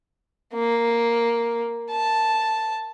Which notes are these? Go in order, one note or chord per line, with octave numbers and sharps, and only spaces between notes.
A#3
A5